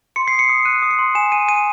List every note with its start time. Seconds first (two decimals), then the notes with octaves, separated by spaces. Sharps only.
0.16 C6 C#7
0.28 D#6 C7
0.39 C#7
0.49 D#6
0.65 F#6 D#7
0.82 D#6
0.91 C#7
0.99 C6
1.15 G#5 E7
1.32 G#5 D#7
1.48 G#5 D#7